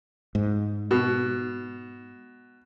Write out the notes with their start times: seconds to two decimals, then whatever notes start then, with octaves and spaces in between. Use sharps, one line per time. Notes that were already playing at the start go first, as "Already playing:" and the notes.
0.35 G#2
0.91 B2